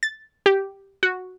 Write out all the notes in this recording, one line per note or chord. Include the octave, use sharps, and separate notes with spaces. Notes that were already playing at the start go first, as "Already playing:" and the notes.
A6
G4
F#4